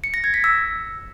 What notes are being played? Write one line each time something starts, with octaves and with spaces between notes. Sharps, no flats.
C#7
A#6
G#6
B6
E6